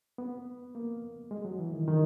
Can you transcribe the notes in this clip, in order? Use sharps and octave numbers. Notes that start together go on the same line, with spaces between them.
B3
A#3
G#3
F#3
E3
D#3
D#3